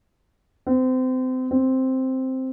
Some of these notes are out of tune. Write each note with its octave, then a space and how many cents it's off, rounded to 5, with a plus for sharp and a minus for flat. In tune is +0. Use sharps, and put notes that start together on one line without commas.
C4 -30
C4 +0